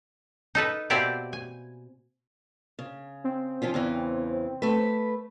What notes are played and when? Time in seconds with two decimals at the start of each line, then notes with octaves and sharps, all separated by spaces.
0.55 D#4 A4 B4
0.90 B2 A#3 C4 E4 G4 D5
1.33 G#5
2.79 C#3
3.24 C4
3.62 F3 C#4 F4
3.74 E2 C#3 E3
4.62 A3 B4